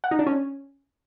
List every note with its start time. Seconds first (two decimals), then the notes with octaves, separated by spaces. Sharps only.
0.04 F#5
0.11 D#4
0.19 D4
0.27 C#4